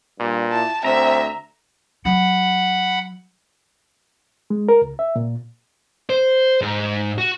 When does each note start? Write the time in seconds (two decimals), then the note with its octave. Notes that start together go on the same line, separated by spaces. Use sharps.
0.20 G2 A#2
0.53 E4 A5
0.84 D2 C4 E5 A#5
2.05 F#3 F#5 B5
4.50 G#3
4.69 A#4
4.82 C#2
4.99 E5
5.16 A#2
6.10 C5
6.62 G#2
7.18 F#4